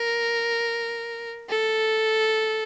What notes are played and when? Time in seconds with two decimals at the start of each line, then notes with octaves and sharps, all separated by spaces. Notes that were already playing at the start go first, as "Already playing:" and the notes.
Already playing: A#4
1.50 A4